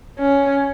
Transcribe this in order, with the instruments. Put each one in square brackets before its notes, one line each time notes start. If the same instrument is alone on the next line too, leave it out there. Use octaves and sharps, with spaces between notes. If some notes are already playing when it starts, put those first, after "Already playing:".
[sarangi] C#4